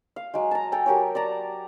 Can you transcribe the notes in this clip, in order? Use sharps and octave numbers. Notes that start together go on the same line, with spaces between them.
F5
F#3 G#3
A5 A#5
A4 G5 G#5
F#3 G4 A#4 C#5
D5 A5 A#5